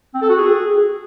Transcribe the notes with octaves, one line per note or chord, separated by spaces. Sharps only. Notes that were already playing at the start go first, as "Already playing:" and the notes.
C4
A4
F#4
G#4